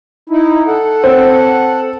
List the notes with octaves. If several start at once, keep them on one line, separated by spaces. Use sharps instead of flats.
D#4 E4
A4 F#5
C4